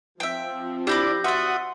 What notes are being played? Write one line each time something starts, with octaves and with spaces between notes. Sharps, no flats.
F3 C4 E5 G5
D4 E4 G4 B5 D6 G6 A#6
F#4 D5 E5 F#5 C6 D#6